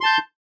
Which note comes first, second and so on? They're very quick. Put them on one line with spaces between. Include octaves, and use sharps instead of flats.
C6 A5 G6